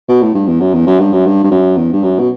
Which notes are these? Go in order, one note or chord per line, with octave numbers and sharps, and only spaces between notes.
B2
A2
G2
E2
F#2
E2
F#2
G2
F#2
G2
G2
F#2
E2
G2
F#2
B2